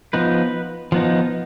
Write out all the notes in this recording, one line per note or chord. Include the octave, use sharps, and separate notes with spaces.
F3 B3 D#4 B4
F3 B3 D#4